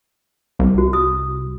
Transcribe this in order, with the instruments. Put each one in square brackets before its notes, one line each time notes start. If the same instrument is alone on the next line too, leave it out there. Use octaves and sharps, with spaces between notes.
[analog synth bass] C2
[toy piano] F#4
D#6